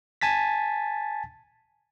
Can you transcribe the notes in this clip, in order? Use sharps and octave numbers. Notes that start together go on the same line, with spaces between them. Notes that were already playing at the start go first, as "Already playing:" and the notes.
G#5 A5 A6 B6